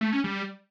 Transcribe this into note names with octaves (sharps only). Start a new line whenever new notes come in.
A3
C#4
G3